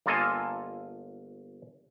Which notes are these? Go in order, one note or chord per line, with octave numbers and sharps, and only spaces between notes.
G1 A#3 F4 A4 D#5 G#5